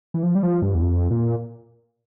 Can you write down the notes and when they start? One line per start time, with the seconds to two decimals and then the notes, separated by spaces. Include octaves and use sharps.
0.14 E3
0.23 F3
0.35 G3
0.43 F3
0.62 G2
0.75 E2
0.82 F2
1.11 A#2